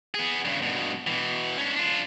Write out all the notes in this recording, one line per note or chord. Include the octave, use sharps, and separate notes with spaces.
B3 G#4
G2 C#3
G2 B2
B2 E3
C#4 D4
D4 F4